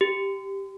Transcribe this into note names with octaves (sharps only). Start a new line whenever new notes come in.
G4